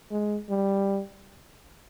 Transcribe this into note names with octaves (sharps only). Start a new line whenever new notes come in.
G#3
G3